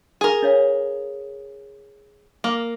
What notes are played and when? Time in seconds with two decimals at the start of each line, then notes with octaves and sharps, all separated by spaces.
0.21 G#4 A#4
0.43 D4 C#5 F5
2.44 A#3